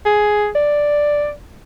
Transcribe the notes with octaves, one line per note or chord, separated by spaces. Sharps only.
G#4
D5